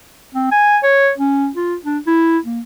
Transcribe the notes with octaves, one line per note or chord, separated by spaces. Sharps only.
C4
G#5
C#5
C#4
F4
D4
E4
A#3